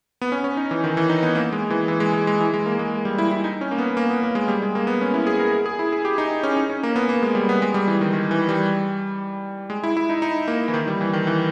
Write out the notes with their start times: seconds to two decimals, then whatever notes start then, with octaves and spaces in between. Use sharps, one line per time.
0.21 B3
0.32 C#4
0.44 C#4
0.57 D#4
0.71 E3
0.84 D#3
0.97 E3
1.10 D#4
1.23 B3
1.35 A#3
1.52 G#3
1.70 E3
1.88 E3
2.00 G#3
2.13 G#3
2.27 G#3
2.41 E3
2.54 G#3
2.66 A#3
2.79 G#3
3.05 G3
3.18 E4
3.31 E4
3.44 D#4
3.61 C#4
3.71 A#3
3.78 B3
3.97 A#3
4.10 B3
4.23 A#3
4.35 G#3
4.48 G3
4.62 G#3
4.75 A#3
4.87 B3
5.01 C#4
5.14 E4
5.27 G#4
5.40 A#4
5.52 G#4
5.66 G#4
5.79 E4
5.93 G#4
6.05 G4
6.18 D#4
6.43 C#4
6.57 D#4
6.70 C#4
6.83 A#3
6.96 B3
7.09 A#3
7.23 G#3
7.35 G3
7.49 B3
7.62 G#3
7.74 G3
7.87 E3
8.01 D#3
8.13 D#3
8.31 E3
8.49 G3
9.70 G#3
9.84 E4
9.97 E4
10.09 D#4
10.22 D#4
10.48 A#3
10.68 E3
10.74 D#3
10.88 G3
11.01 E3
11.13 D#3
11.27 E3